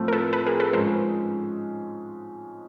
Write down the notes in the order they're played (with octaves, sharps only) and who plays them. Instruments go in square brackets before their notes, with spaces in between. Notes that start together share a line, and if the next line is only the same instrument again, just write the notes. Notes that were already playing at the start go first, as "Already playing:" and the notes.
Already playing: [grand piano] A2 F3 A3 C4
[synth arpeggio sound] A#4
A4 B4
A4 B4
G#4 A#4
A4 B4
[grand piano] G#2 F3 G#3 C#4 [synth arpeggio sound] A#4 C5